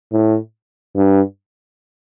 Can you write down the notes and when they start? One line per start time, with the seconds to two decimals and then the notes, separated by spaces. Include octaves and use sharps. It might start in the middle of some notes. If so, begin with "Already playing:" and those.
0.12 A2
0.96 G2